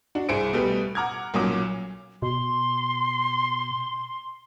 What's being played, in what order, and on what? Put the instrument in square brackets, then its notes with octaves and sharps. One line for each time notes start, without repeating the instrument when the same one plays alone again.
[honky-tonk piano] D4 F#4
C2 G#4 C5 C#7 D7
B2 G3 A3 G4 B4
F#5 A#5 D6 F6 G#6
B1 A#2 F#3 C#4 D6
[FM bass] B2 [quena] C6